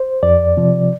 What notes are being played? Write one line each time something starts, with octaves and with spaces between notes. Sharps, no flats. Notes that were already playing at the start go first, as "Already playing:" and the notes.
Already playing: C5
F2 D5
C3 F3